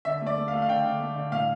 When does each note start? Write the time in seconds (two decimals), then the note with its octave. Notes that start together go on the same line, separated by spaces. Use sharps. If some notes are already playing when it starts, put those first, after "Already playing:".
0.05 D3 E5
0.21 A3
0.26 D5
0.38 A3
0.48 F5
0.53 A3
0.62 F5
0.68 D3 G5
0.85 D3
1.00 A3
1.16 D3
1.32 A2 F5